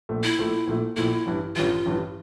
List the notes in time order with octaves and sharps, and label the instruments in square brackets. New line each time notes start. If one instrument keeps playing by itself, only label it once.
[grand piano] A#1 A#2 A3
[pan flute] E4
[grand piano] A#1 A#2 A3
A#1 A#2 A3
[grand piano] A#1 A#2 A3 [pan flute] E4
[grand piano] A1 G2 E3
[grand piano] A1 G2 E3 [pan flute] F4
[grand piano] A1 G2 E3